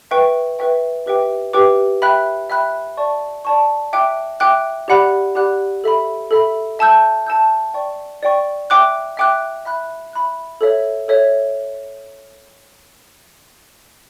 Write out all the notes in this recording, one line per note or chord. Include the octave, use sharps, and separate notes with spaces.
B4 E5 G5 C#6
B4 E5 G5 C#6
G4 B4 E5 G5 D6
G4 B4 E5 G5 D6
E5 G5 B5 F#6
E5 G5 B5 F#6
D5 A5 C#6
D5 A5 C#6
E5 G5 D6 F#6
E5 G5 D6 F#6
G4 D5 F#5 B5 F#6
G4 D5 F#5 B5 F#6
A4 E5 B5
A4 E5 B5
E5 A5 E6 G6
E5 A5 E6 G6
D5 G5 C#6
D5 G5 C#6
E5 G5 D6 F#6
E5 G5 D6 F#6
E5 B5 F#6
E5 B5 F#6
A4 C#5 E5
A4 C#5 E5